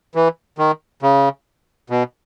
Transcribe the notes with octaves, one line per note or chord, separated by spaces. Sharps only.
E3
D#3
C#3
B2